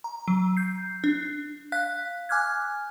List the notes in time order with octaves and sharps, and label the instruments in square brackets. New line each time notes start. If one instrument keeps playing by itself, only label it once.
[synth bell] A#5
F#3
G6 C7
D4
F5 F#6 B6
G#5 D6 F6 F#6 G#6